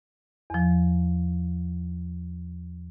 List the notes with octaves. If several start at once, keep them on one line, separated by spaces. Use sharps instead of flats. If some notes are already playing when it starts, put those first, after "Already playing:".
E2 F3